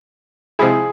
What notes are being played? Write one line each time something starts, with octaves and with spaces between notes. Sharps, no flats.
C3 F3 G#3 E4 G#4